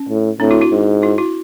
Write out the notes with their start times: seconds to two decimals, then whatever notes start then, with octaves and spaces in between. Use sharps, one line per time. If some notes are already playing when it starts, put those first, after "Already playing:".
Already playing: C#4
0.09 A2
0.40 A2 C4 D4
0.51 E4 F#4
0.61 E4 F#4
0.71 G#2
1.02 E4 F#4
1.18 E4 F#4